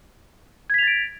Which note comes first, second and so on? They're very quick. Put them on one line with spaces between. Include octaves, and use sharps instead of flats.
G#6 B6 F7 A6 D7